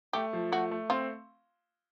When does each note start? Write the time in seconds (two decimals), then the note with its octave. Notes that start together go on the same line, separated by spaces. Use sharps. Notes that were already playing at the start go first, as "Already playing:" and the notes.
0.13 A3 G4
0.33 F3
0.52 A3 F#4
0.71 A3
0.90 C4 F4